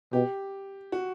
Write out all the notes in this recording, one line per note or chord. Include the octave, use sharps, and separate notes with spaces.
B2 G4
F#4